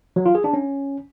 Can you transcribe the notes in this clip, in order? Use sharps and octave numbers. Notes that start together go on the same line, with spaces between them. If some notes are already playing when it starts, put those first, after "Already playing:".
F#3
F4
G#4
D4
C#4